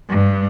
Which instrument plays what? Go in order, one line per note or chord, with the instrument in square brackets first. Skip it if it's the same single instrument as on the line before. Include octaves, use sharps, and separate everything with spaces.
[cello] G2